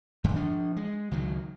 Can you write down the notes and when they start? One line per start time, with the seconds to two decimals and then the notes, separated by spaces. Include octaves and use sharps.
0.24 G2 D3 D#3
0.36 F3 D4
0.76 G#3
1.11 C#2 D#3 F#3